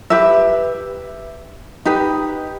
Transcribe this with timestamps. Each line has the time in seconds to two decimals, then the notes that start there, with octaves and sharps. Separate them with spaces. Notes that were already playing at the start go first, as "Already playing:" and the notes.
0.10 G4 B4 E5
1.85 D#4 G4 B4